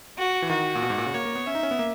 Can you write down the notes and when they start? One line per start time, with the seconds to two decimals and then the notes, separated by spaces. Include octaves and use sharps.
0.17 F#4
0.42 E3
0.49 D#3 F#4
0.75 A#2
0.83 B2
0.90 G#2
0.98 A#2
1.06 C#3
1.14 A#3 C#5
1.25 A#3
1.35 B3
1.46 C#4 E5
1.55 D#4
1.63 C#4
1.71 B3
1.79 A#3